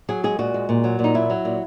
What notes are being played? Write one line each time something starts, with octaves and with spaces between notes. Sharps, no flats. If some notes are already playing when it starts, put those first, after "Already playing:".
F#3 G#4
G#3 G#4
A#2 F#4
G#3
A#2
F#3
A#2
D#4
F#3 E4
F#3
A#2